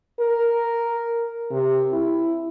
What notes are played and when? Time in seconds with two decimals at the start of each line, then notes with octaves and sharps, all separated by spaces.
0.20 A#4
1.51 C3
1.93 E4